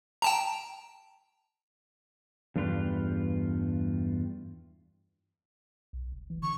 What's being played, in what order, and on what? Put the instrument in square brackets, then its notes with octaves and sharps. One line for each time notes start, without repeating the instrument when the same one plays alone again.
[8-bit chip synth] G5 A5 A#5
[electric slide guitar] E2 G2 A3 F4 G4 B4
[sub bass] B1
F1
E3
[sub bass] D3 [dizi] C#6